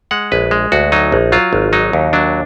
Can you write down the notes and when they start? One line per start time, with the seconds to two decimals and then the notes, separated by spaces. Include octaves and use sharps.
0.11 G#3 F#5
0.32 A#1 B4
0.51 G#3
0.72 D2 F#4
0.92 F#3 D#4
1.12 A#1
1.32 F#3 F4
1.53 G#1
1.73 F#3 D#4
1.93 D#2
2.13 F#3 D4